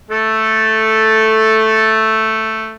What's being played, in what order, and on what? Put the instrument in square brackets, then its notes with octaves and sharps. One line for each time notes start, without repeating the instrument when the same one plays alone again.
[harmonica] A3 A4